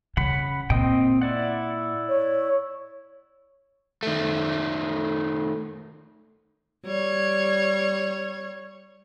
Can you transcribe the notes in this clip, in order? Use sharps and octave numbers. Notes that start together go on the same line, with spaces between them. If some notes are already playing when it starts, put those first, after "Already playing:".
C#3 F#5 B5
A#2 C4 D#5 G5
E4 D5 F#5
C#5
D#3 A3
G3 C#5